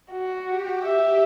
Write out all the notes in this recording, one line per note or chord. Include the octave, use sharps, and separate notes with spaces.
F#4
G4
E5